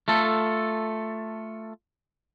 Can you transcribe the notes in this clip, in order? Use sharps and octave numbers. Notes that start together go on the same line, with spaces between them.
A3 F4 A4